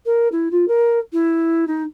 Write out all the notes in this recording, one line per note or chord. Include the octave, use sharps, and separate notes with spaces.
A#4
E4
F4
A#4
E4
D#4